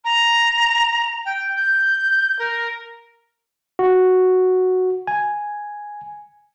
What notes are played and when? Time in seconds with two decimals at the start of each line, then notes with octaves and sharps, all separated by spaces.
0.05 A#5
1.25 G5
1.57 G6
2.39 A#4
3.79 F#4
5.07 G#5